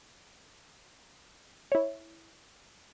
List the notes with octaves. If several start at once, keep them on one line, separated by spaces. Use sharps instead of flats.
E4 C#5